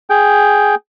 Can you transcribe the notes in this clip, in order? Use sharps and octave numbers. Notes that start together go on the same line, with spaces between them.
G#4 G5